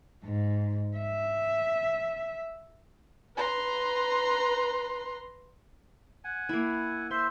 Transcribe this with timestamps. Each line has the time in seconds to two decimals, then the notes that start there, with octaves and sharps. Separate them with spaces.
0.25 G#2
0.97 E5
3.36 B4 A#5 C6
6.24 F#5 G#5
6.49 A#3 E4
7.11 C5 E5 C6